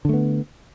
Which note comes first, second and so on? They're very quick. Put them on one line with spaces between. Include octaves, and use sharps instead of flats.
D3 A3 B3